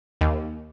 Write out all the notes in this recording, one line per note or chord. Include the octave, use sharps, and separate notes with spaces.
D#2